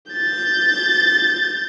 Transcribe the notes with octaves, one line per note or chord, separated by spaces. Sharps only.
G6 A6